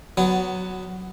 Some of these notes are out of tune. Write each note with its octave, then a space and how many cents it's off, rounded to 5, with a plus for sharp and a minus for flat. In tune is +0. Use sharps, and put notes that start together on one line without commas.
F#3 +0 B3 +15